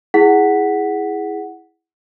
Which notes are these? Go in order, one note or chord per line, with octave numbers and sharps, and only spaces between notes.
E4 G#4 F#5 B6